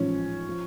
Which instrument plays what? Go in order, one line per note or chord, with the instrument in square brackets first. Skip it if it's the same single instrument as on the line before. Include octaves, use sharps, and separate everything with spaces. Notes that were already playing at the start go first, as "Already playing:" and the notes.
Already playing: [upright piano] A1 G#2 F3 C#4
F3